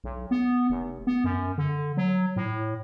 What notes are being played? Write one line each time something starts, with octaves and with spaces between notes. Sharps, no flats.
B1
B3
F1
B3
F#2
D3
F#3
A2